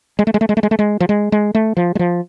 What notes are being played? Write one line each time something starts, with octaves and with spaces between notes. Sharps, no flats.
G#3
A3
G#3
A3
G#3
A3
G#3
A3
G#3
F3
G#3
G#3
A3
F3
G#3
F3